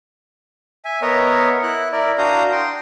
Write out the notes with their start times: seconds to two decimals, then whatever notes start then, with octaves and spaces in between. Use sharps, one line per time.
0.85 E5 G#5
1.02 B3 A#4 C#5 D#5 E5 F#5
1.63 E4 F#6
1.92 E4 A#4 D5
2.18 D4 F#4 F5 A#5 D#6 G6
2.52 G5 C6